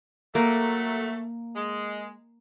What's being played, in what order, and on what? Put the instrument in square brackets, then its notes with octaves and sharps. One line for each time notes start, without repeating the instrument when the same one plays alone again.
[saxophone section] F#3 A3 [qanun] A#3
[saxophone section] G#3